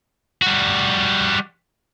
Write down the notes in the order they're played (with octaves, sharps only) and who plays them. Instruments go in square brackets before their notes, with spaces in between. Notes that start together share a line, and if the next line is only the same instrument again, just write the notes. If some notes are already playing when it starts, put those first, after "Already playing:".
[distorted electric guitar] G3 F#4